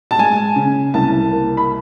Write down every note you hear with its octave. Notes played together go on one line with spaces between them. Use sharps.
A5
G#3 G#5
C#3
C2 A5
A#3
B5